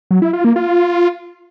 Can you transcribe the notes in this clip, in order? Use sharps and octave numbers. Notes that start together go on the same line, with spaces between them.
F#3
E4
F4
A#3
F4